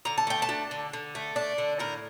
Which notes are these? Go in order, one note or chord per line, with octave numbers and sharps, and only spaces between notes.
D3 A#5
A5
A3 G5
A5
D4
D3
D3
A3
D4
D3
A2 A#4